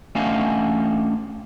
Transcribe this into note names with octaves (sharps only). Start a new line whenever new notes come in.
A3 C#4 D4 F#4 D#5 F5